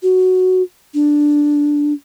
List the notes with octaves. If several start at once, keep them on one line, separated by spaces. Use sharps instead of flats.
F#4
D4